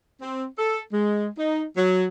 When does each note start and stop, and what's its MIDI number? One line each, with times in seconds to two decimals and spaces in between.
0.22 0.45 60
0.58 0.80 69
0.92 1.28 56
1.38 1.63 63
1.77 2.06 54